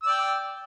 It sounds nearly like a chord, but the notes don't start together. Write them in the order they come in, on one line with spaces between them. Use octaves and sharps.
E6 D5 G5